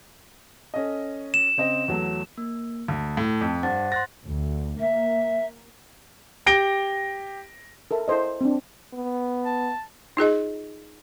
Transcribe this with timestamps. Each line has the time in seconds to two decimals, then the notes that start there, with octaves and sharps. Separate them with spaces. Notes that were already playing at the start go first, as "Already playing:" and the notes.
0.74 C#4 A4 D#5
1.34 E7
1.57 C#3 C4 D#5
1.88 E2 F#3 A3
2.38 A#3
2.88 D2 A5
3.17 A2
3.41 F2
3.63 G2 C5 F#5 A6
3.92 C6 F#6 A6 A#6
4.26 D2
4.79 A#3 E5
6.46 G4 A#6 D7 G7
7.91 A4 A#4 E5
8.08 E4 A4 C5 D#5
8.41 C4 D4
8.93 B3
9.45 A5
10.17 D#4 F4 G#4 D#5